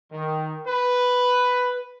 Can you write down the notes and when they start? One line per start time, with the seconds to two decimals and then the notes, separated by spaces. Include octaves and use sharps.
0.12 D#3
0.67 B4